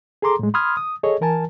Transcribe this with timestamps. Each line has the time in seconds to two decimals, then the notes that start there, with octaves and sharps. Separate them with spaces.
0.22 G#4 A4 A#5 C6 D6
0.39 A2 G#3
0.54 B5 C6 D#6 F6 G#6
0.77 D#6
1.03 G#4 A4 C#5 D#5
1.21 E3 A#4 G#5 A5